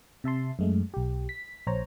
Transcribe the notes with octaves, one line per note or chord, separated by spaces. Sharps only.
C3 E5 A5 C6
F#2 G#3 A3
B1 G4
B6
A#1 C5 C#5 A#5